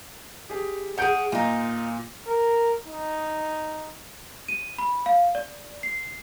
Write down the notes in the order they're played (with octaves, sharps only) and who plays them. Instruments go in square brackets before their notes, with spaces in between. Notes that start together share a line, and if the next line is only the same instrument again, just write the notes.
[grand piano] G4 G#4
[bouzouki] C#4 G#4 [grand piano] F#5 G6 D7
[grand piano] A#2 [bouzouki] D#4 F4
[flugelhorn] A#4
D#4
[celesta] D#7
B5
F5
D5
C7